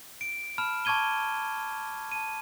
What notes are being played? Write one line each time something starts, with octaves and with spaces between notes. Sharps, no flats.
D7
A5 B5 F6 E7
A5 C#6 D6 G#6 D#7 G7
A5 D#7